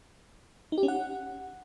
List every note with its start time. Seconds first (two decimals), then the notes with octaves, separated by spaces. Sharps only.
0.72 D#4
0.78 G4
0.83 C#4
0.88 F#5